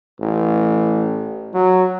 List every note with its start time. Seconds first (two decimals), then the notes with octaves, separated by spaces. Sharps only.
0.20 A1
1.54 F#3